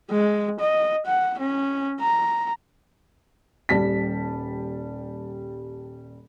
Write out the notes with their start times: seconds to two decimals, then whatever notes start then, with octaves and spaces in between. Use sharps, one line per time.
0.11 G#3
0.60 D#5
1.06 F#5
1.39 C#4
2.00 A#5
3.69 D#1 G3 A5 B6